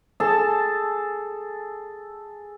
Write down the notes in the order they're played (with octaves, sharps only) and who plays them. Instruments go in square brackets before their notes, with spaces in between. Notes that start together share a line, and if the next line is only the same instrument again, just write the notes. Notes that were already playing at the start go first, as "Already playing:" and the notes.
[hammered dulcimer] G#4 A4 A5